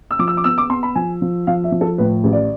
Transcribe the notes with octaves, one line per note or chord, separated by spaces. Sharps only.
E6
F3 D6
E6
D6
B3 E6
D6
B3 C6
B5
F3 G#5
F3
F3 F5
E5
F3
A4
A2 B4
A1
D5